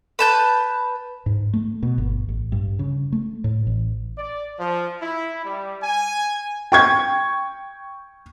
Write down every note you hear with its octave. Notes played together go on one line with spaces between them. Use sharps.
B4 A5 G6
G#2
A3
B2
G1
A1
G2
C#3
A3
A2
A1
D5
F3
E4
G3
G#5
G5 C#6 G#6